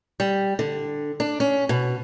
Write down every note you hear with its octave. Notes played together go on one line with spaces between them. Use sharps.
G3
D3
D4
C#4
B2